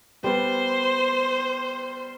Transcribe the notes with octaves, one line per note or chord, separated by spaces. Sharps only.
G3 B3 C5